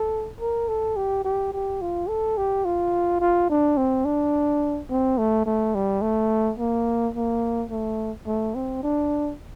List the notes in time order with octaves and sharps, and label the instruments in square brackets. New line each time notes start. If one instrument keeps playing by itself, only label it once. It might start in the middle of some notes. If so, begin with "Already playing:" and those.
Already playing: [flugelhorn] A4
A#4
A4
G4
G4
G4
F4
A4
G4
F4
F4
D4
C4
D4
C4
A3
A3
G3
A3
A#3
A#3
A3
A3
C4
D4